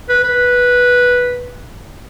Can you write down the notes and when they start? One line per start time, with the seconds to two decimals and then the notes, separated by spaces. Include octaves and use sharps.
0.09 B4
0.24 B4